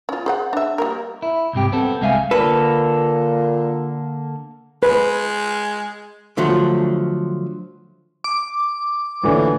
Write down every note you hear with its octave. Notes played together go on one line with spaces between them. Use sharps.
C#4 F4
G#4 C5 F#5
D4 E5
G3 A#3 A#4
E4
C2 G#2 C3 G4
B3 C4 A4
C2 G#3 E5 F5 G5 G#5
A#2 D3 A#3 A4 B4
G#3 B4
D3 F3 F#3 A3
D6
A1 A#2 D3 E3